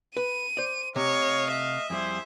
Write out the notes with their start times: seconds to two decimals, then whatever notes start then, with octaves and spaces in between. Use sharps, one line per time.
0.17 B4 D#7
0.57 C5 D5
0.96 C3 A3 C#5 D#5 F5
1.52 E5
1.90 F2 G3 E4 G#4 C5